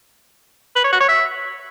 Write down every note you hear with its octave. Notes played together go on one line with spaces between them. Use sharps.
B4
C#5
F#4
C#5
E5